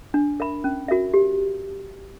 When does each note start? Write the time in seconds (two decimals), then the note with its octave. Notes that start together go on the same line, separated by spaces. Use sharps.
0.14 D4
0.40 A#4 E5 B5
0.64 C#4
0.88 F#4 A#4 E5
1.14 G4